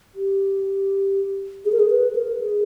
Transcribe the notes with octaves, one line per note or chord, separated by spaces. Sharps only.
G4
G#4
A#4
G#4
B4
A#4
G#4